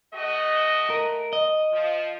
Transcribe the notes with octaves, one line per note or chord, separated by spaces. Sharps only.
A3 F#4 D#5
A#4
D#5
F3